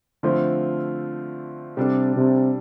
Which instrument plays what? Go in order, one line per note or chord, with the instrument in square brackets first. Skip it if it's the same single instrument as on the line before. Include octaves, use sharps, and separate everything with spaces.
[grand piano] D3 F3 A3 C4 F4
[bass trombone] C3 [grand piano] G3 D4 A4
[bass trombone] C3